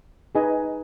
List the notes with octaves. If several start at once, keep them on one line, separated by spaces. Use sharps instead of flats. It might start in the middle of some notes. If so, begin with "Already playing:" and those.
D#4 G#4 B4 D#5 G#5